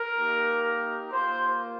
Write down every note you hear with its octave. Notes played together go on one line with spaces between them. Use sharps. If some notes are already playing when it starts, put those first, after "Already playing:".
Already playing: A#4
A#3 D#4 G4
A#3 F4 C5